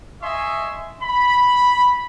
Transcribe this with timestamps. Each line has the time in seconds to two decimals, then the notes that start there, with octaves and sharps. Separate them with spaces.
0.23 D#5 E5 G#5 C6 C#6
1.02 B5